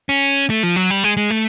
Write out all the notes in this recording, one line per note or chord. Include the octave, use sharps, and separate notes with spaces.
C#4
A3
F3
F#3
G3
G#3
G#3
A3